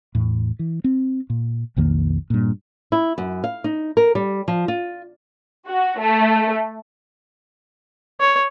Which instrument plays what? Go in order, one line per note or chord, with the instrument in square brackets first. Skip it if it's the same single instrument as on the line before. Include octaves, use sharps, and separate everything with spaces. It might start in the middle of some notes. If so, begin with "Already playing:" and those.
[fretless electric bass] E2 A2
E3
C4
A#2
B1 F2 D#3 A#3
G2 A#2
[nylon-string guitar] E4
F#2
F5
D#4
A#4
G3
F3
F4
[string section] F#4
A3
[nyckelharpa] C#5